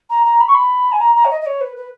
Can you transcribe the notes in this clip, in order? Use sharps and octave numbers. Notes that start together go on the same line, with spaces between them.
A#5
A#5
B5
C#6
B5
G#5
A#5
A#5
C#5
D#5
D#5
C#5
B4
B4